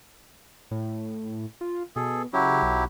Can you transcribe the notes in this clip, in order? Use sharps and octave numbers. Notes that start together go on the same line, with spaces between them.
A2
F4
B2 G#4 A4
C#3 F#3 E4 G4
B1